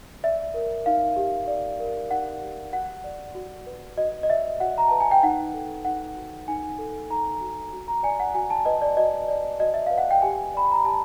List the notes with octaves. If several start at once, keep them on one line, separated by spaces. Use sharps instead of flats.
D5 E5
A#4
D#4 F5
G4
D5
A#4
D#4 F#5
G4
F#4 F#5
D5
F#4
B4
F#4 D#5
D#5
D5 E5
F#4 F#5
A#5
B4 A5
G#5
G5
D#4 F#5
A4
D#4 F#5
F#4
D#4 G#5
A4
D#4 A#5
F#4
F#4
A#5
D5 G#5
F#5
F#4 G#5
A5
B4 D#5
D5
F#4 D#5
D5
F#4 D#5
E5
B4 F5
F#5
G5
G4 G#5
D5 B5
A#5
G4 A5